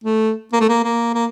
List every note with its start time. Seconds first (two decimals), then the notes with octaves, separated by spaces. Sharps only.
0.04 A3
0.53 A#3
0.61 A3
0.69 A#3
0.84 A#3
1.14 A#3